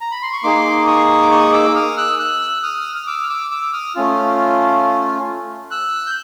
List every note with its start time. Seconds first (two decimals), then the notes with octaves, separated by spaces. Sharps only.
0.01 A#5
0.11 B5
0.22 C6
0.33 C#6
0.43 A#3 D#4 G#4 C6 D6
0.87 C#6 D#6
1.22 D6
1.31 C#6 D#6
1.53 D6 E6
1.75 D#6 F6
1.97 E6 F#6
2.19 E6 F#6
2.63 D#6 F6
2.95 F6
3.07 D6 E6
3.23 F6
3.29 D6 E6
3.51 D6 E6
3.73 D#6 F6
3.96 A3 C#4 F4
5.71 E6 F#6
6.07 G6